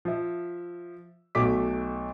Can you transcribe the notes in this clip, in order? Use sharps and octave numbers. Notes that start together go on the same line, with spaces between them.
F3 E5
B1 A3 F#4 D6 B6